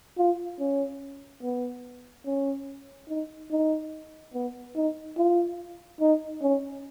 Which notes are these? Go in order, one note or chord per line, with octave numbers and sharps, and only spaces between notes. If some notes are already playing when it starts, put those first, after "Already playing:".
F4
C#4
B3
C#4
D#4
D#4
B3
D#4
F4
D#4
C#4